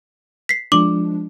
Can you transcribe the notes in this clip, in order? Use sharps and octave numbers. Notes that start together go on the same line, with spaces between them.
B6 C7
F3 G#3 D4 D6 F#7